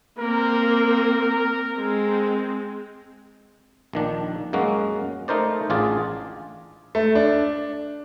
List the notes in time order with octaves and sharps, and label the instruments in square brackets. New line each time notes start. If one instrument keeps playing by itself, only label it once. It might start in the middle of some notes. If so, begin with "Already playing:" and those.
[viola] A#3 C4 [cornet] A#4
[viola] G#3 C4
[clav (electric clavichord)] A#1 D#3 D4
F#2 G#3 A#3 F#4
A3 D#4 A#4 C5 D5
A1 D4 F4 G#4 D5
[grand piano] A3
D4